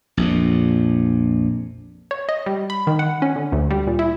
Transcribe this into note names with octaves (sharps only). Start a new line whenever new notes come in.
A#1 F2 A#2
C#5
D#5
G3
B5
D#3
F#5
C#4
D3
D2
G3
A#2
E4